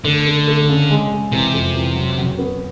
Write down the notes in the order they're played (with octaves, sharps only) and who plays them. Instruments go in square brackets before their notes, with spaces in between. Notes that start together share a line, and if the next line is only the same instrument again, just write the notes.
[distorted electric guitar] D3 [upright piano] A3
[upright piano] A3
A3
C#3
G#3
G#3
[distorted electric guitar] C3 [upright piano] E3
[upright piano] F2
E3
F#3
F#3
B3